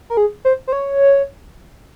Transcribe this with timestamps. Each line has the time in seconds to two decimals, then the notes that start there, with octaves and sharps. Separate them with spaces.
0.10 A#4
0.17 G#4
0.45 C5
0.67 C5
0.73 C#5